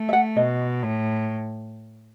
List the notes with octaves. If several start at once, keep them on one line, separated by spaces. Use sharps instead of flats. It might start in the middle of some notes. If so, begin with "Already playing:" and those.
Already playing: A3
E5
F#5
B2 D#5
A2